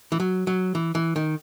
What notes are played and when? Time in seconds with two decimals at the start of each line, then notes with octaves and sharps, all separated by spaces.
0.12 E3
0.20 F#3
0.47 F#3
0.75 E3
0.95 E3
1.16 D#3